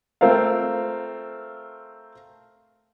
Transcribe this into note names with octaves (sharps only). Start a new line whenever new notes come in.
A3 C4 F4 A#4 F5